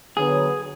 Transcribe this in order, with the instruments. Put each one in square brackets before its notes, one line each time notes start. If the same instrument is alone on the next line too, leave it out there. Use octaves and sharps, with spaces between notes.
[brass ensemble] D3 F#3 B3 [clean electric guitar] G#4